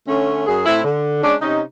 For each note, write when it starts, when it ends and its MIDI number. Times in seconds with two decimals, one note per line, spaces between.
0.07 0.43 50
0.07 0.43 57
0.07 0.43 61
0.46 0.64 42
0.46 0.64 68
0.66 0.82 45
0.66 0.82 60
0.66 0.82 64
0.84 1.22 50
1.22 1.35 56
1.22 1.35 61
1.22 1.35 62
1.42 1.61 48
1.42 1.61 61
1.42 1.61 63